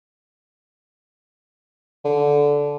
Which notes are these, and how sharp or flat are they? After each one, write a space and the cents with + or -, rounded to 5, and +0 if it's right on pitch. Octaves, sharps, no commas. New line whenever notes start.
D3 -15